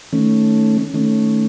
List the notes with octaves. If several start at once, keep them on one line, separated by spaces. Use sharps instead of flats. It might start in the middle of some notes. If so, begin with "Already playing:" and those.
D#3 A3 C#4
D#3 A3 C#4